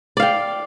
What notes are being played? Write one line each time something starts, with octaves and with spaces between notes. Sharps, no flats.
D5 F5 G5